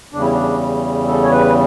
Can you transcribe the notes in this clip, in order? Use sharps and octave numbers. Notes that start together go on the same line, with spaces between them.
E2 C#3 G3 D4
E4
D4
A4
C#5
B4